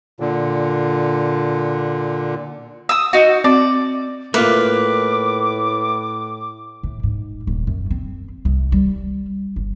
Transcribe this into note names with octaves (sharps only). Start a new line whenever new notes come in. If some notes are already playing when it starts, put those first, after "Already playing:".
A#2 D3
D#6 E6
D#4 F#4
C4 D5
A2 A3 A#3 F4 B4 D6
A2
G#2
D#1
F#2
C4
C2
G3
G1